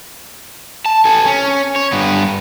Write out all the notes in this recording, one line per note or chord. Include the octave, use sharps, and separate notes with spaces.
A5
A4 G#5
C#4
C#5
G2 B3